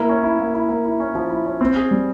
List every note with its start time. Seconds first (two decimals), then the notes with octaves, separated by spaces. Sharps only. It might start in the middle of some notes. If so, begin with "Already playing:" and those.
Already playing: A#3 E4
0.09 C#4
0.23 E4
0.39 A#3
0.54 E4
0.69 A#3
0.85 E4
1.00 C#4
1.15 F3
1.30 E4
1.45 C#4
1.61 C4
1.76 G#4
1.91 G3